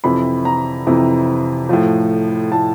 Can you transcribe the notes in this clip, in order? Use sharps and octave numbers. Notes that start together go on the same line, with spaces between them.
F2 C3 E3 B5
A#5
F2 C3 E3
A2 F3
A2 F3 A5